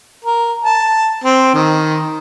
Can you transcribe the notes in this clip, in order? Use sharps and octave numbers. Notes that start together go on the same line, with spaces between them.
A#4
A5
C4
D#3